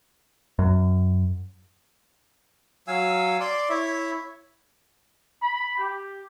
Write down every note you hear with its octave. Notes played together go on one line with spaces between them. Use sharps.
F#2
F#3 F5 G#5 E6
D5 C6 D6
E4 C#5 E5
B5
G4